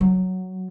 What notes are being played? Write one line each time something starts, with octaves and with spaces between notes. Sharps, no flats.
F#3